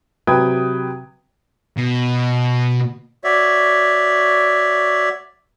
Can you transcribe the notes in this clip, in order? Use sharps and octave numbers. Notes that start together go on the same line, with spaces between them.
C3 F#3 B4 G5 D#6 G#6
B2
F#4 C#5 D5 E5